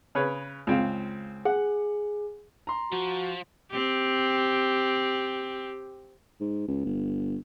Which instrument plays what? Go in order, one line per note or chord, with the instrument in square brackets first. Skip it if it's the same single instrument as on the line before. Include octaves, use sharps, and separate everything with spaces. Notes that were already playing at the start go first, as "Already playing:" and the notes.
[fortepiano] C#3 B4 C#5
C#2 C4 F5
[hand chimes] G#4 [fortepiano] F#5
[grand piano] A#5 C6
[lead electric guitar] F3 [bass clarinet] F#4
[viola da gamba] C4 G4
[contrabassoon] G#2
C#2
G1